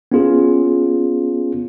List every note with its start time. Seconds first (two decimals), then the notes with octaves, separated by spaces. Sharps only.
0.12 B3 C#4 F4 G#4